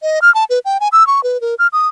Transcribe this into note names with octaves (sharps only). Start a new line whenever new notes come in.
D#5
F6
A5
B4
G5
G#5
E6
C#6
B4
A#4
F6
D#6